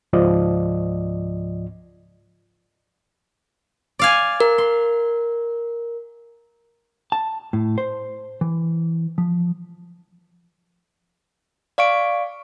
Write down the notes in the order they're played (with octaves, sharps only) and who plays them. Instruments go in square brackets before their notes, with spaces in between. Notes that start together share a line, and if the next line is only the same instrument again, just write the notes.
[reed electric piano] C#2 G#2 F3 D5 D#5
[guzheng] D5 F5 G#5
[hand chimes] A#4
[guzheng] C6
[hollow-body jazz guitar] A5
A2
C5
E3
F3
[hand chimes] D5 F5 C#6 D7